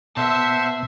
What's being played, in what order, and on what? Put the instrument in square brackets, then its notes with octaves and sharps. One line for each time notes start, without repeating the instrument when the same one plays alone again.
[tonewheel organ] B2 [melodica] C5 F#5 C6 [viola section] E5 [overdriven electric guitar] A5